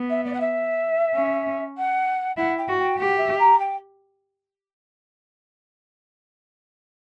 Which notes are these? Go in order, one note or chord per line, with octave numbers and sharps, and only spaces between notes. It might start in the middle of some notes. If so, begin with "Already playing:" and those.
Already playing: B3
E5
D5
F#5
E5
C#4
F#5
E4 F#5
G5
F#4
G5
G4 F#5
E5
A#5
G5